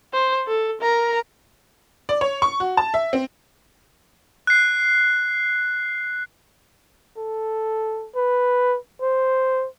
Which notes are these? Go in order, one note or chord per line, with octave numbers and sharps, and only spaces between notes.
C5
A4
A#4 A#5
D5
C#5
C#6
F#4
A5
E5
C4
F#6 C7
A4
B4
C5